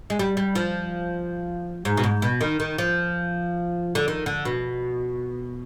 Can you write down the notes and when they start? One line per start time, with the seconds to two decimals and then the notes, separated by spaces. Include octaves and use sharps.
0.10 G#3
0.19 G3
0.37 G3
0.55 F3
1.85 G#2
1.97 B2
2.03 G#2
2.22 B2
2.41 D#3
2.60 D#3
2.78 F3
3.95 D3
4.08 D#3
4.26 D3
4.45 B2